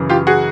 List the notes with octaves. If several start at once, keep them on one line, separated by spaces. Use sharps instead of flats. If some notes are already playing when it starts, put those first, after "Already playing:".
Already playing: F#2 C#3 E3
F4 G4
F#4 G#4